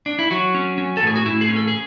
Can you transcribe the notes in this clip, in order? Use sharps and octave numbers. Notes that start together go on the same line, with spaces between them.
D4
E4
F#3 F#4
C#4
C#4
A4
A2 G#4
F#4
A2 E4
G#4
C#4
A4
G#4